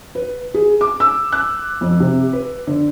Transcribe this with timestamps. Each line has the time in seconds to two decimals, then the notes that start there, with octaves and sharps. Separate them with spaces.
0.15 B4
0.54 G#4
0.81 D6
1.00 E6
1.32 F#6
1.81 F2
2.00 C3
2.33 B4
2.67 D3